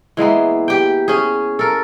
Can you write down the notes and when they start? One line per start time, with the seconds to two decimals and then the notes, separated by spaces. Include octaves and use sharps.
0.17 E3 G#3 A#3 B3
0.68 G4 G5
1.08 C#4 G#4
1.59 A4 A#4